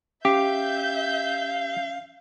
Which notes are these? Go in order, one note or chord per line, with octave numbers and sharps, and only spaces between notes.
C#4 G4 E5 F5 G6